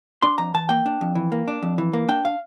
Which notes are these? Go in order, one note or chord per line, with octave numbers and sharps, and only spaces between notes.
D4 C6
F2 A#5
E3 A5
A#3 G5
D4
F2
E3
A#3
D4
F2
E3
A#3
D4 G5
F5